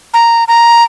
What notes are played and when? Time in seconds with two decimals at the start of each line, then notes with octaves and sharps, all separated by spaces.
0.14 A#5
0.48 A#5